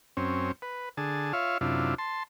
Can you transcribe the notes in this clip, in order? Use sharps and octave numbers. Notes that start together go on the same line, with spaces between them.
F#2 C4 C#4
B4
D3 G#4 A5
F4 C#5 E5 F5
F#2 C3 D4 E4 F4
A5 C6